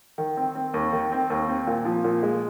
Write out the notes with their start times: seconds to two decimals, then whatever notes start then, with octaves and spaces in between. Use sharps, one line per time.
0.18 D#3
0.37 C4
0.55 C4
0.74 D#2
0.93 D#3
1.12 C4
1.30 D#2
1.48 C4
1.67 A#2
1.85 F3
2.04 A#2
2.23 G#3